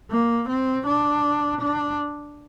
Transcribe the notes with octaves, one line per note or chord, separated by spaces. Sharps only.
A#3
C4
D4
D4